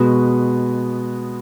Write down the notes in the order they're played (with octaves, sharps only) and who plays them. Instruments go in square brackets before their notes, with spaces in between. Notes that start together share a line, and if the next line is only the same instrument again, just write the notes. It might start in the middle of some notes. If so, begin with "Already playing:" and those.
Already playing: [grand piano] B2 G#3 B3 F#4